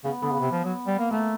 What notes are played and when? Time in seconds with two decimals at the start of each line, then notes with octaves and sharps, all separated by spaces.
0.04 C#3 B3
0.22 D3 B3
0.32 C#3
0.40 C3
0.52 F3
0.64 F#3
0.87 G3
0.99 A#3
1.11 A3 A#3